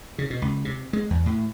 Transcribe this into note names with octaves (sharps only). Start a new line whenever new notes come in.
C#3
B2
C#2
C3
G#3
E2
A2